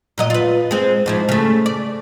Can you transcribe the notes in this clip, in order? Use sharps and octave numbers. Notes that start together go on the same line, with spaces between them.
A#2 F#3 D#5
F4 B4
G#3 C4
G#2 F3 E4
C#3 A3
D5